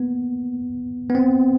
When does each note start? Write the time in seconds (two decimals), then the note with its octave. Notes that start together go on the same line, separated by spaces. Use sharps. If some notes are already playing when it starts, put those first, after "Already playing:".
Already playing: A#3 B3
1.10 B3
1.15 C4